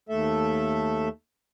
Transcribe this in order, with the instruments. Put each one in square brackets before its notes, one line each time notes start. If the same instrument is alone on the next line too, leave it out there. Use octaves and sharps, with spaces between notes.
[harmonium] D#2 A3 A4 E5